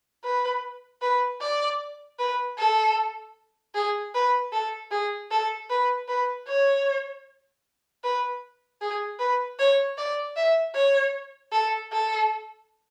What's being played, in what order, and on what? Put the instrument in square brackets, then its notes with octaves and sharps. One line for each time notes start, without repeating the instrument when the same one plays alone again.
[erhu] B4
B4
D5
B4
A4
G#4
B4
A4
G#4
A4
B4
B4
C#5
B4
G#4
B4
C#5
D5
E5
C#5
A4
A4